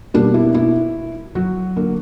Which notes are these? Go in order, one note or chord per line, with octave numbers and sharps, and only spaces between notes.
B2 G3 A#3 D4
E4
E4
F#3 F#4
D3 A#3